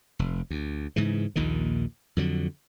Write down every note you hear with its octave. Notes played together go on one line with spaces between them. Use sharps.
F1
D2
G#2 C#3 E3
A#1 D#2 A#2 D#3
F2 D3 F#3